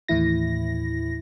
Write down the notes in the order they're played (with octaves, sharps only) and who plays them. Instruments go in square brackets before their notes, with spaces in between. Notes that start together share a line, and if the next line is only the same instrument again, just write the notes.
[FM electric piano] D#2 A2 E3 E4 A#6